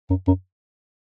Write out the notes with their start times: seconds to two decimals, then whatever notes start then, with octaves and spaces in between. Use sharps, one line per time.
0.10 F#2
0.27 F#2